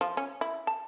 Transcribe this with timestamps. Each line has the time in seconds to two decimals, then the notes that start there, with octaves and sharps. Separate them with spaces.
0.01 F3
0.17 C#4
0.41 E4
0.67 A5